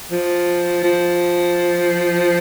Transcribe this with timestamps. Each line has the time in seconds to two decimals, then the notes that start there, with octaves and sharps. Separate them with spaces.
0.11 F3
0.84 F3